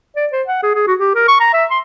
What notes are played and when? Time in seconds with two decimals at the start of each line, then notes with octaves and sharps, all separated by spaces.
0.16 D5
0.32 C5
0.47 F#5
0.63 G#4
0.75 G#4
0.87 F#4
0.98 G4
1.15 A#4
1.28 C#6
1.40 A#5
1.53 E5
1.70 C6